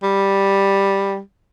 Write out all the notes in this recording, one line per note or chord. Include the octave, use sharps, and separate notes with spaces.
G3